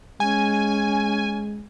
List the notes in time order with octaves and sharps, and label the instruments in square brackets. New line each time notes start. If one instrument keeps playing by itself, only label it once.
[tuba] G#3 [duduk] C#4 [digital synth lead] G#5